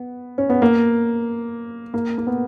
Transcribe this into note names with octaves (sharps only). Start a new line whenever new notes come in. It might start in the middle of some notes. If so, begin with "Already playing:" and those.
Already playing: B3
C#4
B3
A#3
A#3
A#3
B3